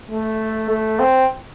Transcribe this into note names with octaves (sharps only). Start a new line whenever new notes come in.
A3
A3
C4